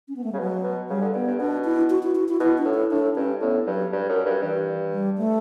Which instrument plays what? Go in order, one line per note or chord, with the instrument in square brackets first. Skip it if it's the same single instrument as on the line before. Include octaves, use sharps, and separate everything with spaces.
[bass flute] C#4
B3
A3
[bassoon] C#3 [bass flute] G3
[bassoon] B2 [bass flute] F#3
[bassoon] B2
[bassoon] C#3 [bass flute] G3
[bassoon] D3
[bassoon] G2 [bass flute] B3
[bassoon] G2
[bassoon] B2 [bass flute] D4
[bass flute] E4
F#4
E4
F#4
E4
[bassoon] B2 [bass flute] E4
[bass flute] D4
[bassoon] A2
[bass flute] E4
[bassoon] A2 [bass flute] D4
[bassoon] G2 [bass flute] C#4
[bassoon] A2 [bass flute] B3
[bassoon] G2 [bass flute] F#3
[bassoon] G2
F#2
G2
[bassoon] G2 [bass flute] E3
[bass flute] G3
A3